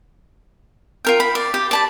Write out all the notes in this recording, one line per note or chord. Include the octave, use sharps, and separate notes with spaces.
F4 A#4 G5
B5
D5
G4
D5 A5 B5